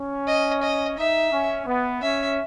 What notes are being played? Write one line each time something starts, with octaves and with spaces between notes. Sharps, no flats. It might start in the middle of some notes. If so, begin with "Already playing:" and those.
Already playing: C#4
D#5
D#5
D#4 E5
C#4
B3
C#4 E5